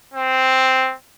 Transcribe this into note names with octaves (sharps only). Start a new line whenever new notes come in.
C4